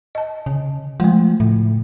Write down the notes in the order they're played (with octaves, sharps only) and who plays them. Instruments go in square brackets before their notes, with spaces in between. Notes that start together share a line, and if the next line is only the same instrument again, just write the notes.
[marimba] D#5 A5
[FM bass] C#3
[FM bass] F3 [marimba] G#3 A3
[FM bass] A2 [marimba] C#3